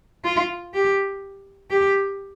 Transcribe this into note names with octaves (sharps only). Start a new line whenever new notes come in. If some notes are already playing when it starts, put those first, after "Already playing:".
F4
G4
G4